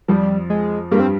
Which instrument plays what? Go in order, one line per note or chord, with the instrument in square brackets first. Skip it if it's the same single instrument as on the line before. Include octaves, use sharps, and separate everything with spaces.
[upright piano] F2 F3 [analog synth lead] G3
[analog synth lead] G#3
[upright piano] G2 G3 [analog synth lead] A#3
[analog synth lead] C4